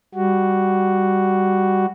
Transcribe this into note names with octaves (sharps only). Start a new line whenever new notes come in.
G3 F#4